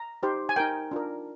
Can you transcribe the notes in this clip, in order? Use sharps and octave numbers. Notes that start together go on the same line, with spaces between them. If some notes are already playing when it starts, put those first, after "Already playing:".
Already playing: A#5
D#4 G4 C5
G#5
D#4 A#4 G5
D4 F4 A#4